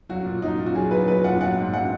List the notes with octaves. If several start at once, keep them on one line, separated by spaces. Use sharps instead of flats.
F#3 F#4
A#2
F#3 D#4
A#2
F#4
F#3 G#4
F#3 B4
F#3 B4
A#2 F#5
F#3 F#5
G#2
F#3 F#5